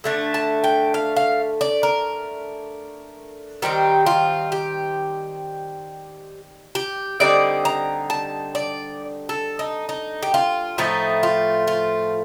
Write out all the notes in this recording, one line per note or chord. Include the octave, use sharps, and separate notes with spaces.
D3 A3 D4
A5
G5
F5
F5
D5
A#4
D#3 G3 C4 D#4 G4
F4
G4
G4
D3 G3 C4 D#4 D5
A#5
A5
D5
A4
D#4
D#4
G4
F4
A2 F3 A3 D#4
F4
F4